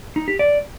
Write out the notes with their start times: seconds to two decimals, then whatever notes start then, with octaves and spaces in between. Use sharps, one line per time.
0.16 D#4
0.28 G4
0.39 D5